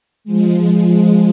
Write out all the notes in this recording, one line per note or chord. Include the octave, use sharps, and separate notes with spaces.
F3 G#3